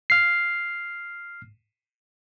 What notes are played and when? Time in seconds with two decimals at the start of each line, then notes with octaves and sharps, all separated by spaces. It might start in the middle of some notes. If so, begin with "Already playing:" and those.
0.10 F6 C7